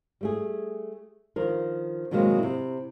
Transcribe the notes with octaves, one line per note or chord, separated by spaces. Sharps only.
G3 A3 G#4
D#3 F3 D4 A#4
B2 D#3 F#3 G#3 A#3 C4
C3 E4